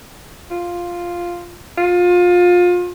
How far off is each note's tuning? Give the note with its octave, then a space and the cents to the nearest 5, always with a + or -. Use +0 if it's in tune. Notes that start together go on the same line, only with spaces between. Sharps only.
F4 +0
F4 +25